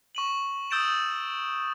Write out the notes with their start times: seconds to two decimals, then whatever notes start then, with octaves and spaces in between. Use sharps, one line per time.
0.15 C#6 D#7 F#7
0.71 D#6 E6 G6 A6 D7 E7